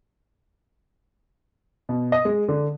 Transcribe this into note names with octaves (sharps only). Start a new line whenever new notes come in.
B2
D#5
G#3
D3